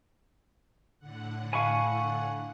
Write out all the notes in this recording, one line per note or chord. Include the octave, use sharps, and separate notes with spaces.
A2 D3 F#5
F5 G#5 A5 B5 C#6